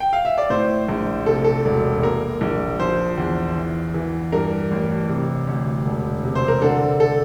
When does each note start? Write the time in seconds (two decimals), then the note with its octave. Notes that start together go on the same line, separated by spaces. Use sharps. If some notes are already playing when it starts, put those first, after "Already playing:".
0.00 G5
0.13 F5
0.25 E5
0.38 D5
0.50 A2 C5
0.89 A#1
1.26 C3 A4
1.44 A4
1.65 E1
2.03 A#3 A#4
2.41 A#1
2.80 F3 C5
3.17 E2
3.56 E3
3.94 E3
4.32 G2 A#4
4.71 A1
5.09 C3
5.47 D2
5.85 E1
6.24 C3
6.35 C5
6.48 A#4
6.62 D3 A4
7.00 A4